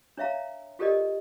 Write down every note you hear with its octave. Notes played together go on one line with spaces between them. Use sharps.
D4 C#5 E5 F5 A#5
F4 G4 A4 A#4 D5 D#5